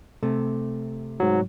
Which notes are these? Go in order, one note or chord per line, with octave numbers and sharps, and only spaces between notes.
C3 A3
G#2 F#3